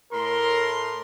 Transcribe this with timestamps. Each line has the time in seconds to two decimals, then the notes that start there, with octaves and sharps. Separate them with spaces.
0.13 A2 A#4 C6